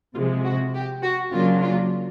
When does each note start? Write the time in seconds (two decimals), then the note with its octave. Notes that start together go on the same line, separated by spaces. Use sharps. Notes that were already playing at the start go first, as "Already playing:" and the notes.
0.15 C3 F3 G#3 F4
0.44 F#4
0.74 G4
1.03 F#4
1.32 C#3 F#3 A#3 D4 F4
1.62 F4